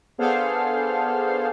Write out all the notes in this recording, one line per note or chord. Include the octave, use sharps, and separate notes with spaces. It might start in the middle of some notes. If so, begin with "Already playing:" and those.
B3 D4 G#4 A4 C5 F5